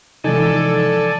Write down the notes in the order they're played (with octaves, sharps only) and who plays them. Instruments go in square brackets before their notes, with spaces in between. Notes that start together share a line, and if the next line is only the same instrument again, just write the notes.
[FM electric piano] C3 F3 G#3 [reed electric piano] E3 D#4 [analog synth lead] A4 [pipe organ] D5 G#5